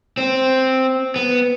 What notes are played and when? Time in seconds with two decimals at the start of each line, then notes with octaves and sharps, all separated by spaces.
0.17 C4
1.16 B3